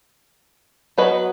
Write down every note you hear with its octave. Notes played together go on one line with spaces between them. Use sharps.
F#3 B3 F#4 B4 D#5